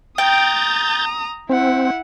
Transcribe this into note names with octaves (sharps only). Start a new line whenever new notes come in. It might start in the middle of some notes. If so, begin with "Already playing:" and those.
G5 A#5 D#6 G6 A6
C4 E4 F#5